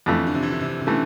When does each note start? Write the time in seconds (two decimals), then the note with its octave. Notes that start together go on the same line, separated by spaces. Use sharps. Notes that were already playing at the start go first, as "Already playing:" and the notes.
0.06 F2 D3 E3 A3
0.27 D3
0.34 C3
0.42 E3
0.52 D3
0.60 C3
0.81 C3
0.86 D3 E3 A3